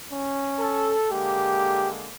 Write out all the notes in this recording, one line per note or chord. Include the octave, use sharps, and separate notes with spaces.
C#4
A4
D3 G#3 A#3 G4